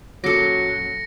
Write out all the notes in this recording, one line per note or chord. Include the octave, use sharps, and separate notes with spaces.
F#2 A#2 F#3 A4 D6 A#6 C#7